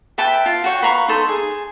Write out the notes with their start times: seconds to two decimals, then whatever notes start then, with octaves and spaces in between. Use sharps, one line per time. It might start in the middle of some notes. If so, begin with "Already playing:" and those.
0.18 B4 E5 G5 A5
0.46 F4
0.64 F#4 C#5 G5
0.82 B4 F5 A#5 C#6
1.08 D#4 A4 C6
1.28 G#4